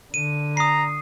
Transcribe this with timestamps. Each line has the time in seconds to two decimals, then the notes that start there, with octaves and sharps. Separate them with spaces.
0.14 D3 D#7
0.57 A#5 D#6 C7